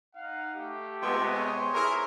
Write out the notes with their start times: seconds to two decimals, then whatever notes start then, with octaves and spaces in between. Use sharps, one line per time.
0.16 D#4 F5 F#5
0.55 A3 G4
1.02 C3 G#3 B3 F4 E5 G5
1.33 C5 C#5 G#5 C6
1.75 E4 G#4 A#4